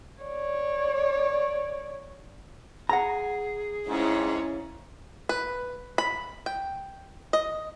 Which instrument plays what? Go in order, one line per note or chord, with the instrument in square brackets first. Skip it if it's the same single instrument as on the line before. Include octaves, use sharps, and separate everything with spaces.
[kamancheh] C#5 D5
[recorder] G#4 [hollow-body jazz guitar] F#5 A#5
[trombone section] F2 G#2 [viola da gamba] C#4 E4 C#5
[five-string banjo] B4
B5
G5
D#5